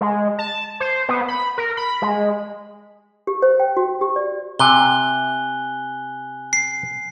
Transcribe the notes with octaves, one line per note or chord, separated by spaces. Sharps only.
G#3
A5
C5
B3
B5
A#4
B5
G#3
G4
C5
G5
F#4
G4
D5
C3 G#5 F#6 G7
C7